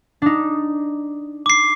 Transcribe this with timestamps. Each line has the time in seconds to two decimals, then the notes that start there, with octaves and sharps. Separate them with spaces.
0.22 D4 D#4
1.46 D6 C7